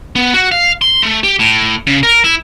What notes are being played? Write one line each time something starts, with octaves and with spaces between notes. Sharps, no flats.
B3
F#4
F5
C6
A3
G4
A2
C#3
A#4
E4